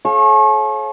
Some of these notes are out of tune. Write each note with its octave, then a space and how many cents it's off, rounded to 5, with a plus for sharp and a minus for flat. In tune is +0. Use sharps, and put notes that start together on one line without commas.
A4 -45 C#5 -35 F5 +0